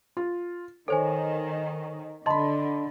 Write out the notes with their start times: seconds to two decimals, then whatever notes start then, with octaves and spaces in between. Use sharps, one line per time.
0.17 F4
0.88 D#3 A4 C5 C#5 G#5
2.26 D3 D#5 A5 B5 C6